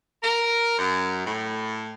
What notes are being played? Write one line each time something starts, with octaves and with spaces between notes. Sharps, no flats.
A#4
F#2
A2